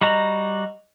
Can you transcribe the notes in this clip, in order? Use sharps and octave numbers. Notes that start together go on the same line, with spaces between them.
G3 F#4 D#5 A#5 F7